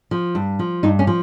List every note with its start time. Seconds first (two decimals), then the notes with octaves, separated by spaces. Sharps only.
0.11 F3
0.35 G2
0.59 F3
0.83 G2 D#4
0.99 C#4
1.07 F3